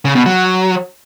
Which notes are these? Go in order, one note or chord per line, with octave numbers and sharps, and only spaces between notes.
C#3
B2
F#3